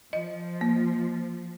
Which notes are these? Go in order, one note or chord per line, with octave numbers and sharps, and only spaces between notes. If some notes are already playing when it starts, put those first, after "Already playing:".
F3 D#5
A#3